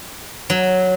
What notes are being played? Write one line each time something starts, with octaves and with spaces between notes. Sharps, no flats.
F#3